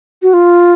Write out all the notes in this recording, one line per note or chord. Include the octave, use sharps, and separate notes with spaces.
F#4
F4